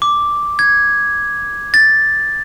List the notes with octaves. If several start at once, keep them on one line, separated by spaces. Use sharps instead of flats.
D6
G#6
A6